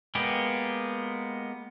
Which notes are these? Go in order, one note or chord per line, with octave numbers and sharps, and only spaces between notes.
G#3 A#3 B3 G4